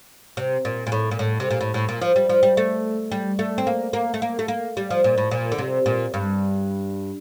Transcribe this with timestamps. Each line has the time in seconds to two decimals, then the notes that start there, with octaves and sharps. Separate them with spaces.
0.37 C3
0.65 A#2
0.87 A#2
0.92 A2
1.11 A#2
1.19 A2
1.40 C3
1.50 A#2
1.61 A2
1.74 A2
1.89 A#2
2.02 F3
2.16 G3
2.29 F3
2.43 G3
2.57 A3
3.12 G3
3.39 A3
3.58 C4
3.67 A#3
3.93 A#3
4.14 A3
4.22 A#3
4.39 A3
4.48 A#3
4.77 G3
4.91 F3
5.04 A#2
5.18 A2
5.31 A#2
5.52 D3
5.58 C3
5.86 A#2
6.14 G2